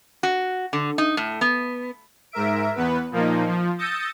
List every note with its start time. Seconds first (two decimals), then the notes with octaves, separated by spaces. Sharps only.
0.23 F#4
0.73 D3
0.98 D#4
1.17 A2
1.41 B3
2.32 G#2 A#4 E5 D7
2.76 E2 B3 B4
3.11 A#2 F3 A#3 D#4
3.47 F3
3.78 D#6 E6 G6 A6 A#6 C#7